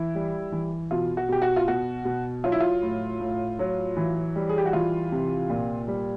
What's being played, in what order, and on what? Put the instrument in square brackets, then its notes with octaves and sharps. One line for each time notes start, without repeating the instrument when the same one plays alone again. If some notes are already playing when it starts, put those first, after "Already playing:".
Already playing: [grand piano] E3 E4
G3
E3
B2 F4
F#4
B2 G4
F#4
F4
B2 F#4
B2
F#3 F4
E4
F4
A2
A2
F#3
E3
G3
G#4
G4
F#4
E3 F4
C3
A#2
G3